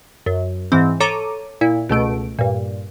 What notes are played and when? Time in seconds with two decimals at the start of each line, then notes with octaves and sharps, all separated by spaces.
0.26 F#2
0.72 G#2 E3 C4
1.00 A4 C#5 A#5 D6 D#7
1.61 A#2 E4
1.89 C#2 B2 A3 D7
2.39 G2 A#2